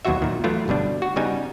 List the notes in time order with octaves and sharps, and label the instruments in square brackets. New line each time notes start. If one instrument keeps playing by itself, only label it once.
[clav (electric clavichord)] D#2 B2 F#3 F4 F#4 E5
A#2 D#3
E3 F#3 A3 E4 F4
G1 B2 G3 D4
F#4
C#3 G3 B3 D#4 G#5